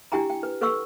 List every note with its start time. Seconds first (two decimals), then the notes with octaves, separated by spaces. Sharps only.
0.12 D4 E4 G4 G5 G#5 A#5
0.30 G5
0.43 B4
0.61 A4 B4 C#5 F#5 C#6 E6